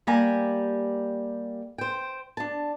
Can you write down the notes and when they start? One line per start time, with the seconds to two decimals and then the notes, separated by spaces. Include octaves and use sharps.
0.07 G3 A#3 G4 G#5 A#5
1.78 C5 G5
2.37 D4 A5